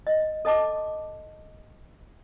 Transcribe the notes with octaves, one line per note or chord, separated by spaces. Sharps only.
D#5
A4 D#5 A5 D6